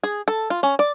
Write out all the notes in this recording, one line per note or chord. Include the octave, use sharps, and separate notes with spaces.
G#4
A4
F4
C#4
D5